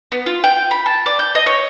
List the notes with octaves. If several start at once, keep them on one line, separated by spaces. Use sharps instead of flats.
B3
F4
G5
B5
A5
D5
G6
D#5
C#5